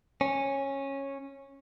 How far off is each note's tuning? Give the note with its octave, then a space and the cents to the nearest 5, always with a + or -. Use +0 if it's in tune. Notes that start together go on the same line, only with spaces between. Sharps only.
C#4 -15